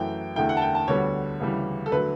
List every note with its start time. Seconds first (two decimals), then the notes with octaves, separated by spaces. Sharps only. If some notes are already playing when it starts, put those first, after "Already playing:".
Already playing: F#2 E3 A3 G5
0.36 E2 D3 A3 E4 G5
0.49 F#5
0.57 A5
0.62 G5
0.75 A5
0.88 D2 D3 G3 B3 C#5
1.40 D2 C#3 E3 G3 C#4
1.86 A4
1.92 D3 F#3 A3 B4